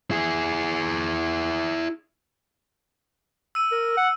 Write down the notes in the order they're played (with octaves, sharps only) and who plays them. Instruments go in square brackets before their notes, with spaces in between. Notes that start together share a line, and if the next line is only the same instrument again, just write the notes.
[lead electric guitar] E4 G#4
[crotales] E6 D#7
[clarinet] A#4
F#5